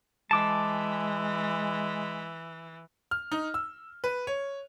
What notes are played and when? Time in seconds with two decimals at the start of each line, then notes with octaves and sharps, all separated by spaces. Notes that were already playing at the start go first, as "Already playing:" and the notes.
0.31 E3 G#3 A5 D6
3.11 F6
3.32 D#4
3.54 E6
4.04 B4
4.27 C#5